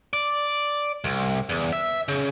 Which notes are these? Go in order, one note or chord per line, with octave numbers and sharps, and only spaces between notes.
D5
C2
E2
E5
C#3